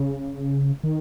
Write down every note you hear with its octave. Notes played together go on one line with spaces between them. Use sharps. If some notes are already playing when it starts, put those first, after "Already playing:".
Already playing: C#3
D#3